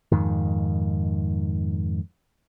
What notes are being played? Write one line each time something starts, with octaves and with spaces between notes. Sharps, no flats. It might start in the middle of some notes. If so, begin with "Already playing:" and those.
F2 G#2 D#3